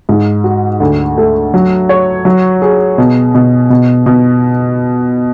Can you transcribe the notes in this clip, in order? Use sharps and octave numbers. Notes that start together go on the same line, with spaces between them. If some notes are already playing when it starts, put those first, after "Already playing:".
G#2
F#4
D2
A3
F#3
C#5
F#3
G#4
B2
B2
B2
B2